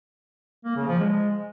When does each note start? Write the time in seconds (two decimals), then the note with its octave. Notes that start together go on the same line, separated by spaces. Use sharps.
0.65 A#3
0.76 C#3
0.87 F3
0.99 G#3